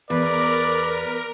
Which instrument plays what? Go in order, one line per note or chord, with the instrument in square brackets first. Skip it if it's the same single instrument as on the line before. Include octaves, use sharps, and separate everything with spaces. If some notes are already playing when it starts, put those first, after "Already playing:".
[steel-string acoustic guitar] E2 [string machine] A#4 [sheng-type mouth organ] B4 [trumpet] D5